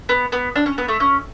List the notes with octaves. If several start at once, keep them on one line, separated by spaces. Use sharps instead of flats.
B3
B3
D4
C#4
B3
A3
C#4